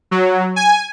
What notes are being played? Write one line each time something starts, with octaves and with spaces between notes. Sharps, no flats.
F#3
G#5